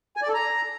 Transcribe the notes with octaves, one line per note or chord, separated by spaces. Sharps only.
G#5
D5
A4
A#5